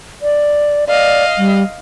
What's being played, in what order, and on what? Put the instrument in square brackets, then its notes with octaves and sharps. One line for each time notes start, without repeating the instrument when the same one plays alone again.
[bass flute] D5
[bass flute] D5 [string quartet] D#5 F5
[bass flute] G3